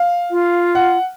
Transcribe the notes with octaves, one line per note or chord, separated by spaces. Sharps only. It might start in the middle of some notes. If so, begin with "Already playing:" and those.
Already playing: F5
F4
F#5